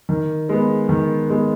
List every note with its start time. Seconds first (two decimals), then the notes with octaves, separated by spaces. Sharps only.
0.09 D#3
0.49 G#3 B3
0.89 D#3
1.28 G#3 B3